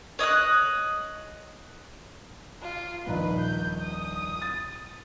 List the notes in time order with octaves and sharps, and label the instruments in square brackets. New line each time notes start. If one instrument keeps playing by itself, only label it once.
[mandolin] C#5 D#5 D#6 F#6
[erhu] F4
[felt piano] D#1 A#1 D#4 [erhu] B4
[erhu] G6
D#6
[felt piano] A6